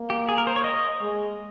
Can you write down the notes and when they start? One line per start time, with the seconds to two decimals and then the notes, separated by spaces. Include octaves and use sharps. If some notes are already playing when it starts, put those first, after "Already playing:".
Already playing: A#3
0.10 G4
0.29 G#4
0.38 A#4
0.47 C5
0.56 C#5
0.64 D#5
1.01 G#3